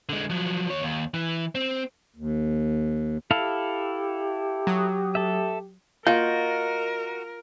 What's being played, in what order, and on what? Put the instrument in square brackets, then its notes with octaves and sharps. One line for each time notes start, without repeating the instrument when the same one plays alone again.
[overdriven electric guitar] D3 G#3
F3 F#3
D#2 C#5
D#2
E3
C4
[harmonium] D#2
[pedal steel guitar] E4 A4 F5 [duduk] G4
[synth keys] F#3 D#6
[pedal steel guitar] A4 E5
[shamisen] A#3 [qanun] F4 [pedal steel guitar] F#4 D#5 G6 [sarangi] A#4